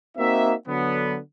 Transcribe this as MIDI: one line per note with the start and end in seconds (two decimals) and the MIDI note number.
0.18 0.53 58
0.18 0.53 60
0.18 0.53 63
0.18 0.53 66
0.18 0.53 76
0.67 1.18 50
0.67 1.18 54
0.67 1.18 59